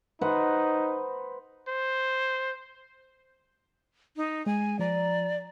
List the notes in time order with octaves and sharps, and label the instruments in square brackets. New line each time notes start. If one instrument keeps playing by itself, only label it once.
[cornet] D#4 [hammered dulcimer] B4 C5 F#5
[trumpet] C5
[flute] D#4
[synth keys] G#3 [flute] G#5
[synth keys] F3 A#5 [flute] D5